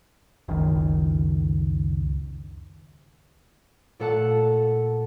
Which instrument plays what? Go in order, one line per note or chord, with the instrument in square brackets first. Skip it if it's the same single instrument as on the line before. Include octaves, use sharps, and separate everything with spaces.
[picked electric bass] F#1 C#2 D#3
[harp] A#2 A3 A4 F#5 A5